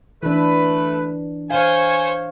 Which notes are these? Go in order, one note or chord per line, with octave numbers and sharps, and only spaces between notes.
E3 A3 D4 B4
C5 C#5 F5 G#5